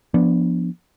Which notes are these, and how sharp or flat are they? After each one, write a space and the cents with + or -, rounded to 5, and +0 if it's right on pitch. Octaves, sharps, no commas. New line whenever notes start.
F3 +0 B3 -20 D4 -15